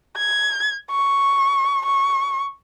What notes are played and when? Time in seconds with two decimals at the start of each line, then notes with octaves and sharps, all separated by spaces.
0.17 G#6
0.91 C#6
1.86 C#6